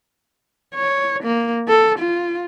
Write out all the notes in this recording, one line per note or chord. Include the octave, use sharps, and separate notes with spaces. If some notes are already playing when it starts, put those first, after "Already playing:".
C#5
A#3
A4
F4